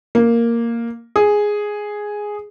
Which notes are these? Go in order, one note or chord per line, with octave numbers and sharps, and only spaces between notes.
A#3
G#4